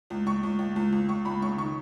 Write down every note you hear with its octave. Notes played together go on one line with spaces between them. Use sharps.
C#2
C#2 C#6
C#2
C#2
C#2
C#2
C#2 C#6
C#2 B5
C#3 C#6
D#3 C#6